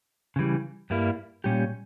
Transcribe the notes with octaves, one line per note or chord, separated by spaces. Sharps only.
C#3 E3 G3
G2 G3 A#3 E4
A#2 G3 C#4 G4